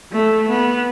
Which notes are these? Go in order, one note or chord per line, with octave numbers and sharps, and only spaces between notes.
A3
B3